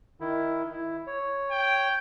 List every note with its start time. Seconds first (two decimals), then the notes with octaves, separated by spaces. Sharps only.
0.20 D#3 E4
0.73 E4
1.07 C#5
1.52 G5